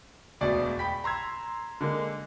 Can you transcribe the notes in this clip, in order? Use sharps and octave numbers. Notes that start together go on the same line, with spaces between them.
E1 D2 B2 D5
G5 B5 B6
A#5 C6 E6 G#6
D3 G#3 A#3